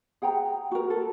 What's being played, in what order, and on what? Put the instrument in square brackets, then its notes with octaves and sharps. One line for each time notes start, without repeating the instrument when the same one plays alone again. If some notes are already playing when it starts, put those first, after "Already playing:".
[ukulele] G#4 F#5 G5 A#5
F#4 A#4
A4